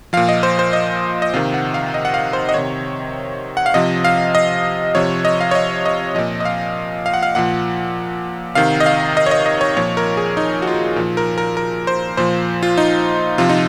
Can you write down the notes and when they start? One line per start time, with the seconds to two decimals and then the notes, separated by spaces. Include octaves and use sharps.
0.13 A#2 F3 F5
0.29 D#5
0.43 C5
0.59 C5
0.73 D#5
1.22 D#5
1.34 C3 D#3 F5
1.54 F#5
1.74 F5
1.94 D#5
2.05 F#5
2.14 F5
2.33 C5
2.49 D#5
2.54 C3 D#3 C#5
3.57 F#5
3.66 F5
3.74 C3 F3 D#5
4.05 F5
4.35 D#5
4.95 C3 F3 C#5
5.25 D#5
5.41 F5
5.51 C#5
5.55 D#5
5.86 D#5
6.15 A#2 F3 D#5
6.40 D#5
6.45 F5
7.06 F5
7.14 F#5
7.23 F5
7.35 A#2 F3 F#5
8.55 C3 D#3 F5
8.80 D#5
8.86 F5
9.17 D#5
9.26 C#5
9.31 D#5
9.46 D#5
9.61 C#5
9.76 A#2 F3 C#5
9.97 A#4
10.17 G#4
10.37 D#4
10.62 F#4
10.67 F4
10.96 A#2 F3
11.17 A#4
11.38 A#4
11.57 A#4
11.87 C5
12.17 A#2 F3 C5
12.63 F4
12.78 D#4
13.38 C3 F3 F4
13.49 D#4